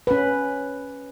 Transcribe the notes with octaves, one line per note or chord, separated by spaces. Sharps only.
C#4 B4